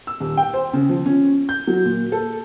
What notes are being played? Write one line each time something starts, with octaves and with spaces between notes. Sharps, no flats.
E6
D#1
G5
C5
C#3
F3
C#4
G6
F#3
A#2
A4